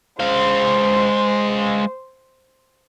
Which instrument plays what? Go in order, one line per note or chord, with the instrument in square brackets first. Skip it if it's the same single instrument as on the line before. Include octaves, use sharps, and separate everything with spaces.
[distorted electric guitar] G#3 F5 [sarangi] C5